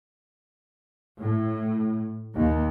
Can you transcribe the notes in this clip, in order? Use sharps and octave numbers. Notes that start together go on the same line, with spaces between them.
A2
D#2